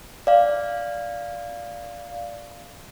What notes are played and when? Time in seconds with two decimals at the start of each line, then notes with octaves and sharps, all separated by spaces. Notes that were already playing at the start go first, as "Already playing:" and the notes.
0.27 D5 F5